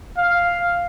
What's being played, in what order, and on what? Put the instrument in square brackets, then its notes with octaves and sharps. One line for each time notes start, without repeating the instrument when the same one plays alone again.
[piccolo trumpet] F5